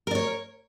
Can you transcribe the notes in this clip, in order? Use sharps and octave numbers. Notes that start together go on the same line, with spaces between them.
A#4 C#5 D5